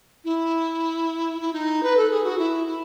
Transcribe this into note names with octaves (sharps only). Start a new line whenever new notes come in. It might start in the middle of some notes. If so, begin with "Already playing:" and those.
E4
E4
D#4
B4
A4
G#4
F#4
E4
E4